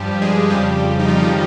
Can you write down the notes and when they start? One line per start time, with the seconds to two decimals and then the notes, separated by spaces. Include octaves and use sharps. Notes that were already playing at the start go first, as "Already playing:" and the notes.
Already playing: G2 F3 G3 G4
0.22 G#3 G#4
0.50 F2 C#3 F3 G3 G4
0.99 D#4
1.08 F3 F4
1.22 D#3 D#4